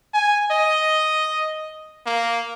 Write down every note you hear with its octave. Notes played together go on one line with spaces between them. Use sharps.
G#5
D#5
A#3